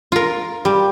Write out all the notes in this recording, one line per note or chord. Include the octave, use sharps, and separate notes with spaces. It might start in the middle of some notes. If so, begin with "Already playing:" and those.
F4 A#4
G3